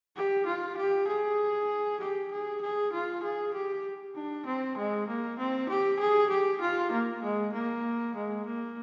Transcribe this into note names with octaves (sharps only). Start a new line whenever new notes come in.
G4
F4
G4
G#4
G4
G#4
G#4
F4
G#4
G4
D4
C4
G#3
A#3
C4
G4
G#4
G4
F4
A#3
G#3
A#3
G#3
A#3